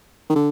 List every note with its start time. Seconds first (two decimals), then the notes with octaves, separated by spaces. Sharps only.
0.30 D#3
0.35 D3